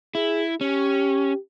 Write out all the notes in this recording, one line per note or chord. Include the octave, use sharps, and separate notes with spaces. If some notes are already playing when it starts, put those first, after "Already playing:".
E4 G#4
C#4 G4